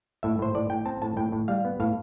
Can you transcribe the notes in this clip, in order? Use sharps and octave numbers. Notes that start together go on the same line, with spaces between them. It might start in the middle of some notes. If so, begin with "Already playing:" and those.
A2 E5
A2 C5
A2 D5
A2 G5
C4 A5
A2 A5
A2 G5
A2
G3 F5
B3
A2 F5